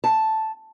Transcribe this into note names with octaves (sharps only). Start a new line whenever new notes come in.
A5